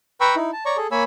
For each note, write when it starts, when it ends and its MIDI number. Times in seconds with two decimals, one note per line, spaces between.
0.21 0.35 71
0.21 0.35 79
0.21 0.35 82
0.21 0.35 83
0.21 0.35 85
0.21 0.35 88
0.35 0.51 63
0.35 0.51 64
0.53 0.64 81
0.65 0.77 73
0.65 0.77 74
0.65 0.77 82
0.65 0.77 85
0.77 0.87 68
0.77 0.87 69
0.91 1.04 58
0.91 1.04 73
0.91 1.04 80
0.91 1.04 83
0.91 1.04 88